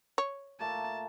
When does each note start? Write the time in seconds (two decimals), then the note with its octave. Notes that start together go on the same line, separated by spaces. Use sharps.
0.18 C#5
0.60 A#2 A3 A#3 A5